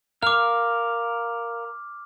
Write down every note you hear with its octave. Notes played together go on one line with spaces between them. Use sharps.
A#4 F5 D6 F6